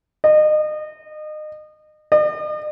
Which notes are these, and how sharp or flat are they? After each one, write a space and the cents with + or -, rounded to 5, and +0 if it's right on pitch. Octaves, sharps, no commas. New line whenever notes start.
D#5 -30
D#5 -45